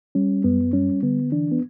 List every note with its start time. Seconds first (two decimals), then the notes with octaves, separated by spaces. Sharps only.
0.15 G3 C#4
0.44 F#2 B3
0.73 G3 C#4
1.02 D3 B3
1.32 E3 D4
1.51 B3